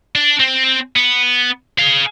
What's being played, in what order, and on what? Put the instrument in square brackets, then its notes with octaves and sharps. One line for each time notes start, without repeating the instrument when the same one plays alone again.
[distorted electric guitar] D4
C4
B3
G#4 F5